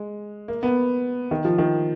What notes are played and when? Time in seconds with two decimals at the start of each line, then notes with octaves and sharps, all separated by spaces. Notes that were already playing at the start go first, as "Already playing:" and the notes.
Already playing: G#3
0.48 A#3
0.63 B3
1.31 D#3
1.45 F3
1.58 D#3